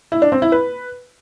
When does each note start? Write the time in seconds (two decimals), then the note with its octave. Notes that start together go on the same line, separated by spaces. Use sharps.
0.12 E4
0.22 D4
0.32 C4
0.42 E4
0.52 B4